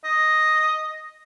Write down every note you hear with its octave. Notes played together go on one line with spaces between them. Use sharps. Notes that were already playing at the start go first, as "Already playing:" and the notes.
D#5